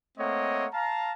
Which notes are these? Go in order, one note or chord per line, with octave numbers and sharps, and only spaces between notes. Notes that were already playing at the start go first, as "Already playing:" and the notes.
A3 A#3 C4 C#5 D#5 F#5
F5 A5 A#5